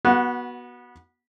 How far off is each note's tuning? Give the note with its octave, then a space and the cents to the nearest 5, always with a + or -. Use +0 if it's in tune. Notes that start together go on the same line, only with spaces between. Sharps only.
B3 -20 F#4 +5